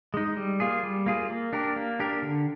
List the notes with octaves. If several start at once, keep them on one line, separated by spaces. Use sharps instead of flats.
G#3 D#4
G3
A#3 F4 G#4
G3
A#3 F4 G#4
A#3
D4 G4 A#4
A#3
D4 G4 A#4
D3